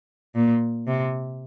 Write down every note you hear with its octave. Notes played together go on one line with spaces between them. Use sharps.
A#2
C3